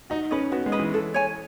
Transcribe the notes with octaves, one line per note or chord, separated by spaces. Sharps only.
D#4 F#4
C#4 B4 D#5
B3 F#4
G#3
B4 D#5
E3
A4
C#5 G#5